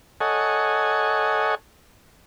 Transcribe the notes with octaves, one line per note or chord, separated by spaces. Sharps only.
A4 C#5 D#5 F#5 G#5